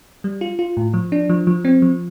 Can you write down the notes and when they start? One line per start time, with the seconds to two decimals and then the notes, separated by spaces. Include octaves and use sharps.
0.24 G3
0.41 F4
0.59 F4
0.77 A2
0.94 F3
1.12 D4
1.29 F3
1.47 F3
1.65 C4
1.82 F3